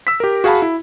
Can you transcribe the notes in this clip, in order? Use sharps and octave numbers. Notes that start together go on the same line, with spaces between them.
E6 B6
G4 A#4
F#4 G#4 F5 F#5 A5 B5
E4